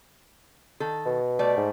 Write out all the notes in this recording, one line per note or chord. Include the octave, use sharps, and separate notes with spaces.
D#3 A4
B2
G3 A3 D5
G#2